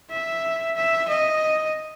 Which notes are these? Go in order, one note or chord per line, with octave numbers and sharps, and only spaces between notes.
E5
E5
D#5